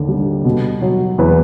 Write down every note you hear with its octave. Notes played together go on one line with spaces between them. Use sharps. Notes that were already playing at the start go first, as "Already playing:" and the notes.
Already playing: D#2 D3
G3
B2
F#3
E2 B4